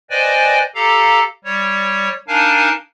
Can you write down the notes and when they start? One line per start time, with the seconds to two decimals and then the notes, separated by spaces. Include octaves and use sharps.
0.10 B4 C5 D5 D#5 G5 G#5
0.75 G4 A4 F5 A#5
1.45 G3 C#5
2.28 D4 D#4 A#4 F5 G#5 A5